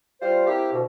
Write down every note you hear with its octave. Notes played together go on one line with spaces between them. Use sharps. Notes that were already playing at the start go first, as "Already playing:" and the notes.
G3 F4 C5
A#3 C4 E4 G4
D2 B2